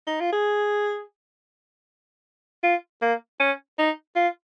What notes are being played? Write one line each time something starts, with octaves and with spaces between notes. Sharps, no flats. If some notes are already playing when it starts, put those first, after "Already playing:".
D#4
F4
G#4
F4
A#3
C#4
D#4
F4